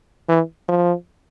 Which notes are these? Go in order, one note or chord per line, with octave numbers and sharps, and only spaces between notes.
E3
F3